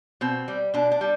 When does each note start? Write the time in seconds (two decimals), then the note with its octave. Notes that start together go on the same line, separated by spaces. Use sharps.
0.21 B2 C4
0.48 G3
0.74 B2 D4
0.92 D4
1.01 G3